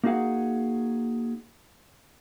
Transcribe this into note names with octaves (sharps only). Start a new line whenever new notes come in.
A#3 D#4 F#4 G#4 F5 F#5